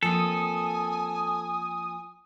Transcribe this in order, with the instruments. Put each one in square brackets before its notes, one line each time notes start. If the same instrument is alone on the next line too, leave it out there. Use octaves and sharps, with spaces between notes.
[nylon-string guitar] F3 A#3 C4 [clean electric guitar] A4 [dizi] G#5 [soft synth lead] D#6